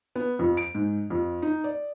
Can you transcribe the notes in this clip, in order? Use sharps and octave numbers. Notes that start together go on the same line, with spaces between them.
B3
F2
D7
G#2
F2
D#4
D5